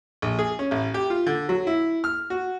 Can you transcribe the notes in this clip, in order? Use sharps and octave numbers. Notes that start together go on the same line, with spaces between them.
A#1
G#4
C#4
A1
G4
F4
D3
F#3
E4
F6
F#4